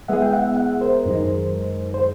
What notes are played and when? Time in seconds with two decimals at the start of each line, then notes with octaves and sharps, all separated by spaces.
0.08 G#3 B3 E4 G#4 E5 F#5
0.22 G5
0.33 E5 F#5
0.57 E5 F#5
0.81 A#4 C5
1.05 F#2 D#3 G#3
1.94 C5